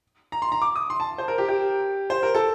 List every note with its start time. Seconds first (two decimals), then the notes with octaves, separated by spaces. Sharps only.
0.32 A#5
0.42 C6
0.52 A#5
0.62 D6
0.76 D#6
0.90 C6
1.00 A5
1.18 C5
1.28 A#4
1.38 G4
1.48 G4
2.10 C5
2.23 A#4
2.35 A4